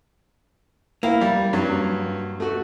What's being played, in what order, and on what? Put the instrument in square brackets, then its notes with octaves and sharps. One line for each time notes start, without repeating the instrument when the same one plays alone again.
[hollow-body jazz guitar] A#3 [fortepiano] E4 F5
[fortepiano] G3
G2 F#3
A3 F#4